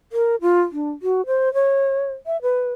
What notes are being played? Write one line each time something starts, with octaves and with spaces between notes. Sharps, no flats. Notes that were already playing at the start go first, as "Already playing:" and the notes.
A#4
F4
D4
F#4
C5
C#5
E5
B4